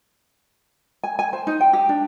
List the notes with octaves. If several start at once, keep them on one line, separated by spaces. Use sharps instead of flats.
G#5
G#5
C5
D#4
G5
G4
D4